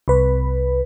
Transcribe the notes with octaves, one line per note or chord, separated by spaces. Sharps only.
C2 B4